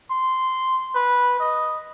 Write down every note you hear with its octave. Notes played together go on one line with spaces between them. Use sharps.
C6
B4
D#5